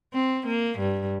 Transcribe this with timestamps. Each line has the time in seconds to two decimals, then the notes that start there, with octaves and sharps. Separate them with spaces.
0.14 C4
0.47 A#3
0.79 G2